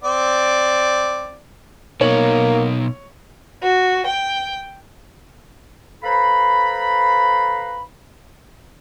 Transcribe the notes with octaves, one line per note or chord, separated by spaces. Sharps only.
C4 D5
B2 A#3 D#4 C#5 F#7
F#4
G5
A4 B4 C5 F5 A#5 B5